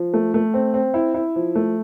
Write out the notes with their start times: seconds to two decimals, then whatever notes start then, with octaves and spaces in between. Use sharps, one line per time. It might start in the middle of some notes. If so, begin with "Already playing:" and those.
Already playing: F3
0.14 A3
0.34 A3
0.54 C4
0.74 C4
0.94 E4
1.14 E4
1.36 F3
1.55 A3